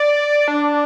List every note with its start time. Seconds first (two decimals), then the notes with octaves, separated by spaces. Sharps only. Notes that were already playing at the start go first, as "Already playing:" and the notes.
Already playing: D5
0.48 D4